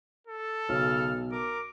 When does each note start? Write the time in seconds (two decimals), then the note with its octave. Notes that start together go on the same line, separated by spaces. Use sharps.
0.27 A4
0.69 B1 C#3 F6
1.32 A#4 D6